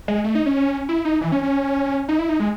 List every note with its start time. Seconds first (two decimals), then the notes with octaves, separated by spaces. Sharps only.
0.08 G#3
0.24 A3
0.35 D#4
0.46 C#4
0.89 E4
1.05 D#4
1.21 E3
1.32 C#4
1.43 C#4
2.09 D#4
2.19 E4
2.29 D#4
2.40 G#3